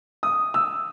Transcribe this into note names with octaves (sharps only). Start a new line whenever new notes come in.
D#6
E6